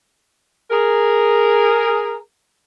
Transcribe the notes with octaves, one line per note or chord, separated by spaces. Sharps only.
G#4 A#4